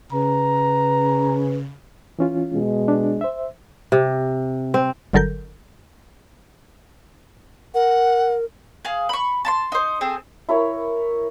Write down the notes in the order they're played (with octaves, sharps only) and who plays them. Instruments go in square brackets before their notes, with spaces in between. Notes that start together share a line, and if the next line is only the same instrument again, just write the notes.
[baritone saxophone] C#3 [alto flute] B4 [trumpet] A#5
[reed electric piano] E3 C#4 F4
[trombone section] B2 G#3
[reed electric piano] D4
C5 E5
[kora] C3
C4
[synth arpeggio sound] G1 D3 F#3 A4 A#4 G6
[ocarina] A#4 [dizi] F#5
[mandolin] G#4 F5
B5 C#6
A5 B5 C6
D#4 C5
C4 G#4 A4
[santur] E4 A#4 C#5